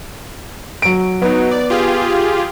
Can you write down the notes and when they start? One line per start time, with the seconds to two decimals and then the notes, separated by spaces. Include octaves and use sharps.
0.82 F#3 D7
1.22 F#3 B3 D#4
1.51 D5
1.70 F4 G4 G#4